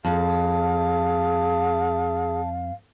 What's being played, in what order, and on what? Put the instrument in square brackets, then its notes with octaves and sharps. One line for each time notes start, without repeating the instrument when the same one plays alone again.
[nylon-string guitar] F2 [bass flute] G#4 [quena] F5 [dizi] A5